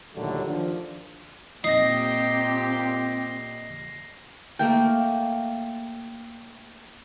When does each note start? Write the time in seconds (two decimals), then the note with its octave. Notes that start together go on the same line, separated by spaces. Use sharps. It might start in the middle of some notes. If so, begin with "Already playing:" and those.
0.15 D#2 A#2 D3 F#3 G3 A3
0.45 D#3 F3 D4
1.64 A#2 C4 D#4 G4 A#6 C7
4.59 A3 A#3 A#4 G5